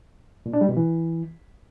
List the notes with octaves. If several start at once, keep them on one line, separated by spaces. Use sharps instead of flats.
A#2
D4
G3
B2
E3